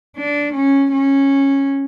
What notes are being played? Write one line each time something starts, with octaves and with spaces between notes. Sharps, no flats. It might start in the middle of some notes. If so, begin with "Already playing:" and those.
D4
C#4
C#4